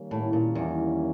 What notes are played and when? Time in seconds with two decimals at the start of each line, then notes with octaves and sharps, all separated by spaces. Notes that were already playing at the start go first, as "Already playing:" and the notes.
Already playing: D#3 G3 A#3 C#4
0.11 A2
0.33 A#2
0.55 E2